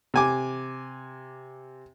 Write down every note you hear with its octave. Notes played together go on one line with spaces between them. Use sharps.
C3 G#5 D6